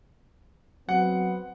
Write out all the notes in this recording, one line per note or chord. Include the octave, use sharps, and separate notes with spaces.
F#3 B3 C4 F#5